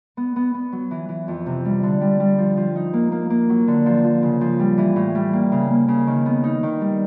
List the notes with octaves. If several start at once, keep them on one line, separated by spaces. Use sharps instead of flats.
B3
B3
B3
F#3
E3
E3
F2
C3
G3
D3
G3
G3
F3
F3
D#4
A#3
A#3
A#3
F#3
D3
F3
F3
C#3
F3
G3
E3
A2
G3
A#3
C#3
A#3
C#3
D#3
B3
D#4
D#3
G3